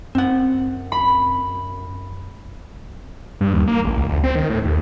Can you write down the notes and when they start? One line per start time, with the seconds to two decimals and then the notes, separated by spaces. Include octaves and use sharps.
0.15 F#2 C4 F#5
0.92 B5
3.41 G2
3.54 D#2
3.67 A#3
3.85 A1
3.97 C#2
4.09 D2
4.24 C4
4.35 D#3
4.50 A2
4.65 D#2